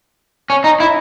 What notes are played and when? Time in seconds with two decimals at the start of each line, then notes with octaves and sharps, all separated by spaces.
0.50 C#4
0.64 D#4
0.80 E4